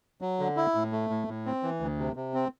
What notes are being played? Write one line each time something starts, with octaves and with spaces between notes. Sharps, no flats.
F#3
D3
E4
A2
A3
A2
A2
C4
E3
D2
C3
C3
C4